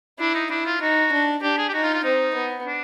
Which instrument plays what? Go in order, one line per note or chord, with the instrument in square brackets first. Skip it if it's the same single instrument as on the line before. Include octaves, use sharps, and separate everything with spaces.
[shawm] D4 [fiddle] E4
[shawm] D#4
[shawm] D4 [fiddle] E4
[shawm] F4
[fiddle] D#4 [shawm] F#4
[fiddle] D4
[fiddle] D4 [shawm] G4
[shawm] G#4
G4
[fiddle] D#4 [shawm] F#4
[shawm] F4
F4
[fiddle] C4 [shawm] D#4
[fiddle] B3
[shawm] D4